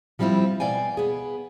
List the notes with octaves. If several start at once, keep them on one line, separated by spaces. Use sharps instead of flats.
F3 G3 C4 E4 F4
B2 D5 F5 G5 G#5
B3 G#4